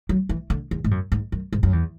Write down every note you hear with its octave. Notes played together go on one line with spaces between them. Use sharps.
F#3
E3
D3
E2
G#2
F#2
G#2
F#2
G#2
F#2
E2